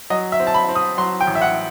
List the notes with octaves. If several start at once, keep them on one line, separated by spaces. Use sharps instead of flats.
F#3 D#5
E5
C4
A5
B5
C4
D#6
F#3 C6
G5
A1
E5
F#5